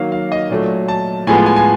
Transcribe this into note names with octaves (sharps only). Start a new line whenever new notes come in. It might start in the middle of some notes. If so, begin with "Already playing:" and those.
Already playing: D#3 F#3 A#3 F5
F5
D#5
A#2 F#3 A3
A5
A2 F3 G#3 B3 G#5
G#5
G#5